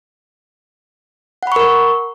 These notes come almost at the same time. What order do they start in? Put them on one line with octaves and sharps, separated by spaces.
F#5 B5 C#6 A#4